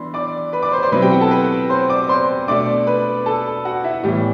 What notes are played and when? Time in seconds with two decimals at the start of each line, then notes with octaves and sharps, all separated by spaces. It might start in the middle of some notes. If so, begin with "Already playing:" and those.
Already playing: E3 B3 D4 B5 C6
0.14 D5 D6
0.53 B4 B5
0.62 D5 D6
0.72 C5 C6
0.82 C5 C6
0.92 B2 F#3 C4 E4 B4 B5
1.02 G4 G5
1.11 F#4 F#5
1.21 A4 A5
1.31 B4 B5
1.70 C5 C6
1.89 D5 D6
2.09 C5 C6
2.48 B2 A3 D4 D5 D6
2.87 B4 B5
3.26 A4 A5
3.65 F#4 F#5
3.84 E4 E5
4.04 A2 E3 G3 B3 G4